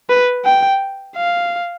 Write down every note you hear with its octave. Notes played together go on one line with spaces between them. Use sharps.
B4
G5
F5